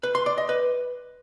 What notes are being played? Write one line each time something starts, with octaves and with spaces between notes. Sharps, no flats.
B4
C6
D5
D#5
B4